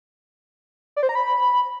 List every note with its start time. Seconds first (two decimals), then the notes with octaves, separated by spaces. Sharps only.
0.96 D5
1.03 C5
1.09 A#5
1.15 B5